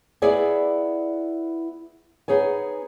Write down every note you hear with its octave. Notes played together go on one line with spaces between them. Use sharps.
B3 E4 G#4 D5 G#5
B3 D#4 G#4 C#5 G#5